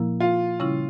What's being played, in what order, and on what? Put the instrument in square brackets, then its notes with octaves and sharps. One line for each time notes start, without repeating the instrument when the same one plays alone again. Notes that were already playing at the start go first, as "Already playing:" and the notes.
Already playing: [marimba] A#2 F3 A#3 E4
[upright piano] F4
[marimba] C#3 G3 C#4 E4